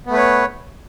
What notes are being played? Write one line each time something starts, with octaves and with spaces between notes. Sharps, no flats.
A3 B3 B4 C#5